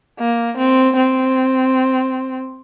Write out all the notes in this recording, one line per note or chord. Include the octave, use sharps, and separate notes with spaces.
A#3
C4
C4